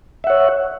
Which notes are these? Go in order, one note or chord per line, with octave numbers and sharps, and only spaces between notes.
C#5 E5 F#5